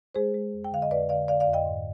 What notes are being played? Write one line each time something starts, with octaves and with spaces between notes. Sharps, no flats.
G#3 G#4 C5
G#3
F2
G5
D3 F5
D#5
F2 B4 D5
D3 D5 F5
D3 D5 F5
D5 F5
F2
D#5 G5
G#2